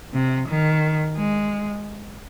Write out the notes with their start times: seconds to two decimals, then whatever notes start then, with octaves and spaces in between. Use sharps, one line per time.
0.13 C3
0.47 D#3
1.17 G#3